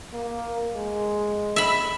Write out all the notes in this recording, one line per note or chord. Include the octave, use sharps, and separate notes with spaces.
A#3
G#3
E5 B5